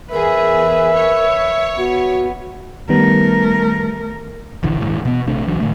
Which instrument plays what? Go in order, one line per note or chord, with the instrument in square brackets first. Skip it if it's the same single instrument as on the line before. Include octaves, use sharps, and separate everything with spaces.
[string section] E2 G#4 [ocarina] A#4 [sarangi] B4 [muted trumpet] E5
[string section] C#5
[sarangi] B3 [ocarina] F#4
[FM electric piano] D#3 G3 B3 [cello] A3 A#4
[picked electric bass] E1 A#1 D3 E3
D#1 D#2 G#2 E3
B2 B3
A#1 C3 A3 D4
C2 E3 F#3 D4
A2 D3 A3